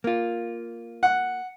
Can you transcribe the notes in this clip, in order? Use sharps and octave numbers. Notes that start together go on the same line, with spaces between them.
A#3 F4
F#5